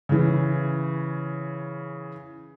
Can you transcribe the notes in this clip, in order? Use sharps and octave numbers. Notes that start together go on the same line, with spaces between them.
C#3 E3